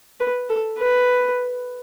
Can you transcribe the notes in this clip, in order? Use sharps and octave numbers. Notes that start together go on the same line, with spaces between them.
B4
A4
B4